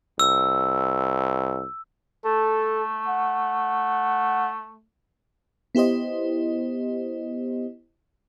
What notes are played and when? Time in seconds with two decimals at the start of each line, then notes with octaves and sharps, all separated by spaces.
0.19 C2 E6
2.25 A3 A4
3.08 F#5
5.75 B3 E4 G4 C5 D#5